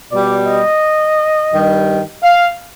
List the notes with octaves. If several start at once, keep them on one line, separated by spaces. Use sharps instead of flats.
B2 G3 D5
D#5
G2 D#3 G3
F5